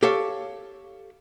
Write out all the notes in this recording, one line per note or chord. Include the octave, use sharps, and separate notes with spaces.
G4 A4 C#5 F5